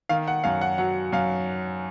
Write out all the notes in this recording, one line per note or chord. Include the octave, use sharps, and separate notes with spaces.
D#3 F5
F#5
F#2 F5
F#5
F#3 F#5
F#2 F5